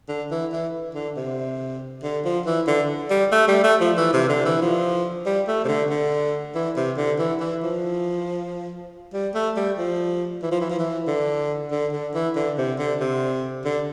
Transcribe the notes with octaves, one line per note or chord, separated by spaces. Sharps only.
D3
E3
E3
D3
C3
D3
F3
E3
D3
G3
A3
G3
A3
F3
E3
C3
D3
E3
F3
G3
A3
C3
D3
D3
E3
C3
D3
E3
E3
F3
G3
A3
G3
F3
E3
F3
E3
F3
E3
D3
D3
D3
E3
D3
C3
D3
C3
D3